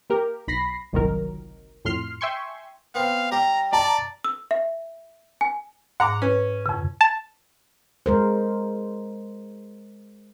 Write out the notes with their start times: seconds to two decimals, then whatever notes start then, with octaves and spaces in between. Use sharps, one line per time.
0.10 A#3 G4 A#4
0.48 B1 B5 A#6 C7
0.93 G1 C2 A#2 D#3 F#3 A#4
1.85 F2 A2 C6 F6 C7
2.21 E5 G5 G#5 C6 C#6
2.95 B3 C4 F5
3.32 G3 G4 A#5
3.73 D5 A5 A#5
4.24 E6
4.51 E5
5.41 G#5
6.00 G#2 F#5 A#5 D6
6.22 C#4 B4
6.66 F2 C#3
7.01 A5
8.06 G#3 A#4 C5